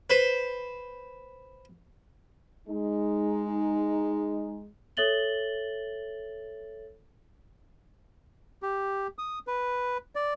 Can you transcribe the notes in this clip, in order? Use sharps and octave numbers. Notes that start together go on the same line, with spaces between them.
B4 C5
G#3 D#4
A4 C#5 E5 A6 F#7 G7
G4
D#6
B4
D5